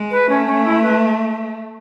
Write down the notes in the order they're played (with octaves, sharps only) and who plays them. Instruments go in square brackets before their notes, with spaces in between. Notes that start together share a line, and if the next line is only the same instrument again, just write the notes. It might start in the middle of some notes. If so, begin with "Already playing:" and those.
Already playing: [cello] G#3
[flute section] B4
[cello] A3 [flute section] C#4
[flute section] C#4
E4
B4